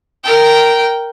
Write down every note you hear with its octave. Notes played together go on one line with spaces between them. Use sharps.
A#4 G5